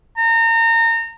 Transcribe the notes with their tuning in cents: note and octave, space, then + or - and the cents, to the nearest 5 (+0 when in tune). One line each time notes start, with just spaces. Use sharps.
A#5 -30